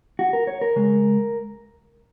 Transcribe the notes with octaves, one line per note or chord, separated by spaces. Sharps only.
F#4
A#4
C#5
A#4
C#3 G#3